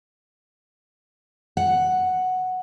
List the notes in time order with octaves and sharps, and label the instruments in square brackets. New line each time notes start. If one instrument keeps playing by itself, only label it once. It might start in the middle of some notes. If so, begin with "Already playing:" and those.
[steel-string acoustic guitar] F#5